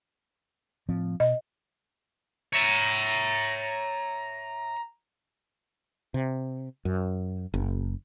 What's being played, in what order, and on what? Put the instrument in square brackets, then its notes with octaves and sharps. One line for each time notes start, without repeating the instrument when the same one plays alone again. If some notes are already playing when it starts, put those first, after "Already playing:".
[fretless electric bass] A2 F3 C4
[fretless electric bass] B2 [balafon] D#5
[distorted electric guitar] C#5 E5 [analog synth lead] A#5
[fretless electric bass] C3
F#2
F#1